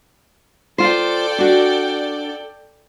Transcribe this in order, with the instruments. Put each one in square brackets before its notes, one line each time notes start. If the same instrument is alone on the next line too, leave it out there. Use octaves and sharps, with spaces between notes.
[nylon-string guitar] F4 C5 [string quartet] A4 D5 G5
[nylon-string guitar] D4 F#4